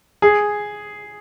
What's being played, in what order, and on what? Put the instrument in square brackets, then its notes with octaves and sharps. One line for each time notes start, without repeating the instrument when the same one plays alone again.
[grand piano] G#4